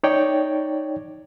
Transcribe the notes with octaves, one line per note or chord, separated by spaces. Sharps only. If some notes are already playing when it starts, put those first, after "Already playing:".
D#4 C#5 D5 G5